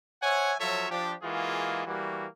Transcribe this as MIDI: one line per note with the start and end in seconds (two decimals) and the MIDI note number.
0.22 0.53 72
0.22 0.53 73
0.22 0.53 76
0.22 0.53 78
0.22 0.53 80
0.59 0.88 53
0.59 0.88 54
0.59 0.88 65
0.59 0.88 69
0.59 0.88 73
0.59 0.88 76
0.91 1.14 53
0.91 1.14 62
0.91 1.14 67
1.23 1.83 52
1.23 1.83 56
1.23 1.83 58
1.23 1.83 65
1.23 1.83 66
1.23 1.83 68
1.87 2.26 52
1.87 2.26 55
1.87 2.26 58
1.87 2.26 66